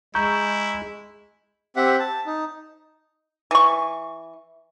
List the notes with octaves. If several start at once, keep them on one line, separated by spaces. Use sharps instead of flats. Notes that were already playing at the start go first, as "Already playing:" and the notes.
G#3 E4 A#5 C#6 G6
C4 G4 E5 F#5
A5
D#4
E3 C#6